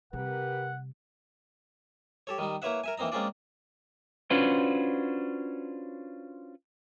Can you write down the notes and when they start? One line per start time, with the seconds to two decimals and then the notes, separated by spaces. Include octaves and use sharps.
0.13 C3 G3 G4 A#4 B4 F#5
2.27 G4 A4 C#5
2.38 D#3 G3 D#4
2.62 A#3 E4 B4 C#5 E5 F#5
2.84 A#4 E5 G#5
2.98 E3 A#3 C4 D#4 A#5
3.12 G#3 A#3 C4 C#4 F4 D5
4.30 C#4 D4 F4 F#4 B4 C5